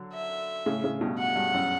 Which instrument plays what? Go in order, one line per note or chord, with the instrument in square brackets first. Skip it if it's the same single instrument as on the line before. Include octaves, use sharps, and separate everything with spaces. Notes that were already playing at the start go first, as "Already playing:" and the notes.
Already playing: [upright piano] D3 F#3
[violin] E5
[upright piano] A2 C#3
A2 C#3
G2 B2
[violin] F#5
[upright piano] G2
F#2